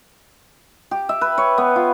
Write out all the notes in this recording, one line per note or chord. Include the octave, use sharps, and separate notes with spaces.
G4
E5
B4
C#5
B3
F4